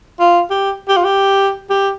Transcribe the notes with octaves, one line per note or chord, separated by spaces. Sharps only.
F4
G4
G4
F4
G4
G4